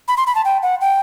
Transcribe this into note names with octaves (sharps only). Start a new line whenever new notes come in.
B5
C6
B5
A5
G5
F#5
G5